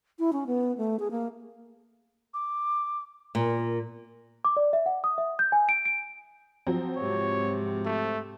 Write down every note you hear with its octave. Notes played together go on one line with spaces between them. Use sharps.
E4
C#4
B3
A3
G#4
A#3
D6
A#2 A#4
D6
D5
E5
F#5
D#6
E5
G6
G#5
D7
D7
F3 F#3 C4
G#2 C3 C#5
A3